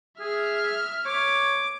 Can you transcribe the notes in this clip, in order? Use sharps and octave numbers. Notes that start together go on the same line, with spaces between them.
G#4 E5 F6
C#5 D6